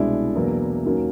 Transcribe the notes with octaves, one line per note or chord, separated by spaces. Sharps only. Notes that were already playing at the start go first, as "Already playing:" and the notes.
Already playing: C2 B2 G#3 D4 E4
E2 B2 F#3 A#3
D#2 D#3 F#3 A#3 C#4